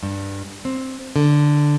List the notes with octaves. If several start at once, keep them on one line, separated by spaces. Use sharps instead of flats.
G2
C4
D3